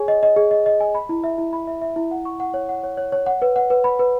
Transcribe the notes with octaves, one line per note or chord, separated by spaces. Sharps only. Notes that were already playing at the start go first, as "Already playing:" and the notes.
Already playing: G#4 C#5 G#5
D#5
D#5
G#4
D#5
D#5
G#5
B5
E4
E5
E4
B5
E5
E5
E4
F#5
C#6
F#5
C#5
F#5
C#5
C#5
C#5
F#5
B4
F#5
B4
B5
B4